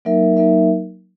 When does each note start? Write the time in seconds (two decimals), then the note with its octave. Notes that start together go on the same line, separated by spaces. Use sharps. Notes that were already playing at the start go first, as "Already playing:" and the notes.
0.05 F#3 A#3 D#4 A#4 E5
0.37 F#3 A#3 D#4 A#4 E5